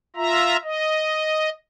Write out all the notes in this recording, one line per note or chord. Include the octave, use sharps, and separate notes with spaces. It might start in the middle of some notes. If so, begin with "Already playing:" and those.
F4 E5 A#5
D#5